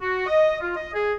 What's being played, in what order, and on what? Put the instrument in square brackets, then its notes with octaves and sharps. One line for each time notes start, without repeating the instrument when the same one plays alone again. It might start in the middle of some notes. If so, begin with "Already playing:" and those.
[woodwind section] F#4
D#5
F4
D#5
G#4